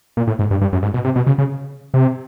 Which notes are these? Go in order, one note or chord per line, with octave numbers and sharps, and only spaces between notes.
A#2
A2
G#2
G2
G2
F#2
G#2
B2
C3
B2
C#3
C#3
C3